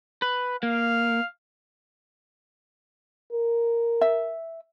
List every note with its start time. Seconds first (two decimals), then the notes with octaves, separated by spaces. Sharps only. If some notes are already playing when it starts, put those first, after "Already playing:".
0.22 B4
0.63 A#3 F5
3.33 A#4
4.01 E5